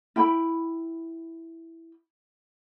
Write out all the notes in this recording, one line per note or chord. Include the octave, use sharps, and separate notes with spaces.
E4 G5 B5